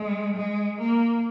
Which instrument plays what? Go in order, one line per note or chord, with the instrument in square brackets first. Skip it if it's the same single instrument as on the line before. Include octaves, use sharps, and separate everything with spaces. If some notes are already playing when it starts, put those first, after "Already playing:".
Already playing: [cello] G#3
G#3
A#3